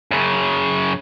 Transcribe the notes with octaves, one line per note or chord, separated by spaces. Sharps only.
F#2 C#3